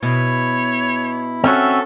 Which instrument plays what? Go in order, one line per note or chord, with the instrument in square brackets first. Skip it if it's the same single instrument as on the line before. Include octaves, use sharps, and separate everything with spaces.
[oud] B2 [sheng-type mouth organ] E4 [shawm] C#5
[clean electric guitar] C4 C#4 F#4 [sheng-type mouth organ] A4 [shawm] E5